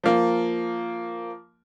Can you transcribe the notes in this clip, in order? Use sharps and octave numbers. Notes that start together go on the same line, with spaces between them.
F3 A#3